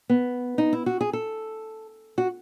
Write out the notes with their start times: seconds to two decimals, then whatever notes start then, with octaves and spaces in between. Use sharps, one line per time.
0.09 B3
0.58 D#4
0.73 E4
0.86 F#4
1.01 G#4
1.13 A4
2.18 F#4